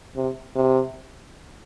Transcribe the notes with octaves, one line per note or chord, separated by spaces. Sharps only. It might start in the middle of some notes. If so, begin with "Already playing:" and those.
C3
C3